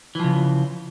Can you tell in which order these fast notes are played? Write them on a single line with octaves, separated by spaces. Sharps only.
E3 F3 C#3